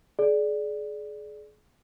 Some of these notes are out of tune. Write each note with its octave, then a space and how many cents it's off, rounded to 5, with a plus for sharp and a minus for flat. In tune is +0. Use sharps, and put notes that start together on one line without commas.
G#4 +35 D5 +0